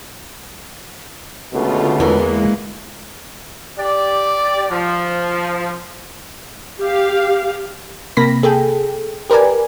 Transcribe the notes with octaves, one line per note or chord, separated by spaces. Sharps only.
C#2 B2 D3 A3 F4
E2 E3 G#3 A#3
G4 D5
F3
G4 F5
C3 A#3 B5 A#6 B6
G#4 A4 G5
G4 A#4 B4 D5 G#5